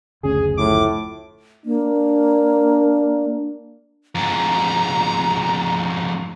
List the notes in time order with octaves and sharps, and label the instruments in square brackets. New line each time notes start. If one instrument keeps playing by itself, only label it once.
[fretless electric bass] F#1 D2 C#4 [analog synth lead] G#4
[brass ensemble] F2 A2 [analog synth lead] D6
[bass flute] A#3 [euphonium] D4
[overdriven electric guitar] F2 G#2 [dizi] A#5